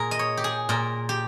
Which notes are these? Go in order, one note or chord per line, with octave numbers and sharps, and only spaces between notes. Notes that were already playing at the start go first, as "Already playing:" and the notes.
Already playing: A#2 G#4 A#4
D#5
C#5
G4
G#4
A#2 A#4
G4